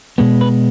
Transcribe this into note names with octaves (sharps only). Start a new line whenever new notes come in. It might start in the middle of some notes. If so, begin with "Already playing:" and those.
B2 G#3 B3
B4